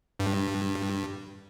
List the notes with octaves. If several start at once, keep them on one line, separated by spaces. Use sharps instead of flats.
G2